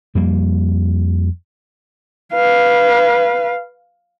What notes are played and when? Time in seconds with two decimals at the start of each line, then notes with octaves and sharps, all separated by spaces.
0.15 F2 G3 A#3
2.33 B4 F5